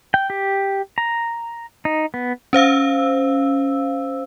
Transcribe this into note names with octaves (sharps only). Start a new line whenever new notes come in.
G5
G4
A#5
D#4
B3
C#4 C5 F5 E6